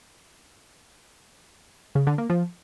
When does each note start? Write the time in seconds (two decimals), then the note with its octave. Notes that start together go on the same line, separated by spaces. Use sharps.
1.95 C#3
2.07 D3
2.18 A#3
2.30 F3